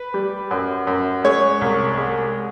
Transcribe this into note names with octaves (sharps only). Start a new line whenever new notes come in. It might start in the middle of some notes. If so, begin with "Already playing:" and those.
Already playing: B4
G3
F#2
F#2
G#3 C#5
C2
G#3